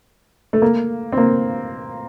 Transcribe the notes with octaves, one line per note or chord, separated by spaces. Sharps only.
A3
A#3
C4
A#3